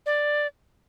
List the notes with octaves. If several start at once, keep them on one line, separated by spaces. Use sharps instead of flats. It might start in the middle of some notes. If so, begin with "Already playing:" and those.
D5